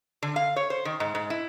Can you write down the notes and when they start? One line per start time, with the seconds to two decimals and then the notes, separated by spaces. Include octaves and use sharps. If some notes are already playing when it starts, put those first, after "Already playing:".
0.23 D3
0.36 F5
0.56 C#5
0.70 C5
0.85 D#3
1.00 G#2
1.15 G#2
1.30 E4